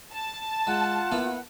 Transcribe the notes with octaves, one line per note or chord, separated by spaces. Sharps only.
A5
G#3 F4 F#5
A#3 B3 E4